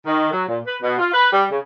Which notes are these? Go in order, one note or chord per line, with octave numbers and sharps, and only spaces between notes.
D#3
F#3
A#2
B4
B2
F4
B4
G3
C#3